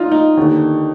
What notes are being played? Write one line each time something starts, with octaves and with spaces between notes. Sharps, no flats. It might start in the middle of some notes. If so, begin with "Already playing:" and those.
Already playing: D#4 F4
D#4
D#2 D3